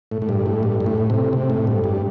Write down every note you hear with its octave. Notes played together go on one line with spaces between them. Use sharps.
A2
A2
G2
A2
G2
G2
A2
C3
C3
A2
G2
G2